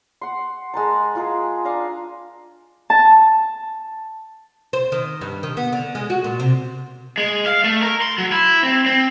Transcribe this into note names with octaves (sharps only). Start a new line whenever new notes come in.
F#5 C6
G#3 A#4 A5
G#3 F4 G#4 A#4
D4 F5 G#5 A#5
A5
C5
D#3
G2
D#3
B3
D3
G#3
F#4
A#2
C3
G#3
F5
A3
A#4
C6
F#3
E4
C4
C4